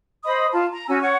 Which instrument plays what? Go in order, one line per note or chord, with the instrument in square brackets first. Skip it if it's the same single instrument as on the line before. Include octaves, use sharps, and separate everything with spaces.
[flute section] C5 D#5 B5 D#6
F4 A5
A#5
C#4 F#4 G#5 E6
C#5 F#5 C#6